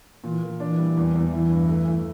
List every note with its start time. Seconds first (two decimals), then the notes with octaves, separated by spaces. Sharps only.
0.24 A#2 E3
0.43 A#3
0.60 E3 D4
0.79 G3
0.97 E2
1.15 E2
1.33 E3 E4
1.52 G2
1.69 A3
1.88 A3